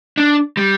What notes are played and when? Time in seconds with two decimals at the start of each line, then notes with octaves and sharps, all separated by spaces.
0.18 D4
0.57 G3